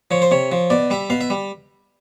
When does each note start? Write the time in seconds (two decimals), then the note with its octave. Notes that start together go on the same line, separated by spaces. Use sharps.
0.11 F3 C#5
0.22 C5
0.31 C3 C#5
0.52 F3
0.70 B2 D5
0.90 G3 E5
1.10 B2 F5
1.21 E5
1.30 G3